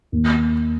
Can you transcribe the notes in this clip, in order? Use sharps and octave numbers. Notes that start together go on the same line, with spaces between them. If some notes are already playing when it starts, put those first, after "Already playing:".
D#2